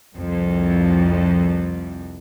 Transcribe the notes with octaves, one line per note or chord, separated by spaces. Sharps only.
C2 F2